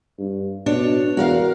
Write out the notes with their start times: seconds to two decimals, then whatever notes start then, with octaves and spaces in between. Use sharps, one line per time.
0.18 G2
0.66 B2 D4 C#5
1.17 E2 F#4 A#4 F5